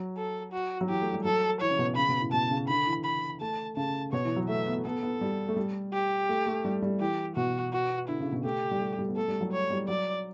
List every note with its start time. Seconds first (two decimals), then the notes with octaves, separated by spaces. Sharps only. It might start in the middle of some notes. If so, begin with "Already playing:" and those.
Already playing: F#3
0.17 A4
0.53 F#4
0.81 F#3
0.89 E3 G4
1.01 A3
1.13 G3
1.24 F#3 A4
1.61 E3 C#5
1.70 C#3
1.79 B2
1.97 C#3 B5
2.09 B2
2.21 A2
2.32 B2 A5
2.51 C#3
2.68 D3 B5
2.87 E3
3.05 B5
3.41 A3 A5
3.77 C#3 A5
4.13 B2 C#5
4.25 E3
4.36 F#3
4.49 A3 E5
4.67 B3
4.85 B3 A4
5.03 B3
5.21 G3
5.48 A3
5.57 G3
5.93 G4
6.29 A3
6.47 A3
6.65 G3
6.82 G3
7.00 E3 G4
7.36 B2 F#4
7.73 F#4
8.08 D3 E4
8.20 C#3
8.32 B2
8.44 A3 G4
8.71 G3
8.80 A3
8.99 G3
9.09 B3
9.17 A3 A4
9.28 G3
9.41 F#3
9.52 C#5
9.70 G3
9.88 F#3 D5